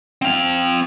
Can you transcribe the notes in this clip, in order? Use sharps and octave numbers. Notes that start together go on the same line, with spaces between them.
C4 F5